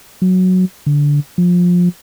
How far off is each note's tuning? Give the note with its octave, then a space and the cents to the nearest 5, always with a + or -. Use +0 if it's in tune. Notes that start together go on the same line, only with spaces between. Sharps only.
F#3 -5
D3 -15
F3 +20